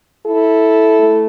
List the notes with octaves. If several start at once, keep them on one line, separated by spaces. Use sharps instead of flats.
E4 A4
A3